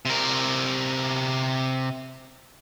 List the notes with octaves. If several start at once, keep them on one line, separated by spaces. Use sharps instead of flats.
C3 A#4